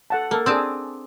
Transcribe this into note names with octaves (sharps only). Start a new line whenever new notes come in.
A4 F#5 A5
A#3 A4
C4 D4 G#4 A5 D#6 E6